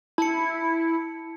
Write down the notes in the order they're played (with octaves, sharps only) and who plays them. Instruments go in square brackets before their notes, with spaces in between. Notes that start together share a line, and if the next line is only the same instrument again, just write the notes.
[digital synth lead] E4 [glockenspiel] A5 C#7